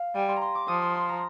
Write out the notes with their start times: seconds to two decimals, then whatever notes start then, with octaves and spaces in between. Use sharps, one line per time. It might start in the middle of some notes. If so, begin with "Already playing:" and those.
Already playing: F5
0.15 G3 G#5
0.28 C6
0.36 A#5
0.41 C6
0.55 D6
0.68 F3 D#6
0.82 C6
0.95 C6
1.09 A#5